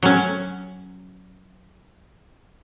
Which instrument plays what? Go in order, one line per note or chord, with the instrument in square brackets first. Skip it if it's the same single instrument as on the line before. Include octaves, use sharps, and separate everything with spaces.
[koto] F#3 C#4